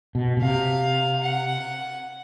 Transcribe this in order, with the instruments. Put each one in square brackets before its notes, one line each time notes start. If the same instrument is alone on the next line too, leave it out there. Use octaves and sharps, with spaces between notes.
[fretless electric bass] B2
B2
[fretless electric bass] C3 [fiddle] F5
[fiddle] F#5